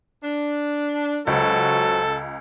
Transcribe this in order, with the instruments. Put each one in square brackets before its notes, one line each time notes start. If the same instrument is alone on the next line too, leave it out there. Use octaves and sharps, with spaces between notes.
[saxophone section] D4
[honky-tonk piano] C#2 [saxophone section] F#3 F#4 C5 [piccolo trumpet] A4